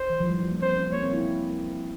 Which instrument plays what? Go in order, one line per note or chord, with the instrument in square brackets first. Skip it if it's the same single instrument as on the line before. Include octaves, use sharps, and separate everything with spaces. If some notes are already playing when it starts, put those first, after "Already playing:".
Already playing: [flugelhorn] C5
[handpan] E3
F3
G3
F3
A#3
[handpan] C4 [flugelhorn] C5
[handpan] C#4
[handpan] A#3 [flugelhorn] C#5
[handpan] C4
E4